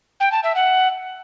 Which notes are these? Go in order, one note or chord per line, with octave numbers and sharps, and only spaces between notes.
G5
A5
E5
F#5